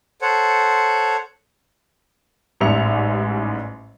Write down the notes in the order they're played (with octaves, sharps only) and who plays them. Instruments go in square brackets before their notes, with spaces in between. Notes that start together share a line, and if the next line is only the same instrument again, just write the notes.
[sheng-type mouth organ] A4 C5 C#5 F#5
[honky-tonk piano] A1 G#2 G3 E5 C#7 F7